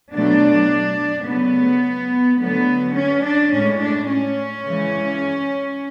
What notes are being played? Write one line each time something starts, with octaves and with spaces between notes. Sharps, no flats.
B2 F#3 A3 D4
C#3 F#3 A3 B3
D3 F#3 A3 B3
C#4
D4
A2 G#3 C#4
D4
C#4
C#3 E3 G#3